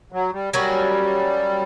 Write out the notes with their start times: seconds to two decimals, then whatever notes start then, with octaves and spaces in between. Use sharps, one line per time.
0.12 F#3
0.33 G3
0.53 F#3 G3 A#3 C#4 F#4